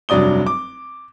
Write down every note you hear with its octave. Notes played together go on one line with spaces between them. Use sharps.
F1 G2 F#3 D5 D#6 G7
D6